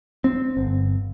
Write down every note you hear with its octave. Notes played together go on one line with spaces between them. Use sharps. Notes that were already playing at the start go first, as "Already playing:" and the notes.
C4
G1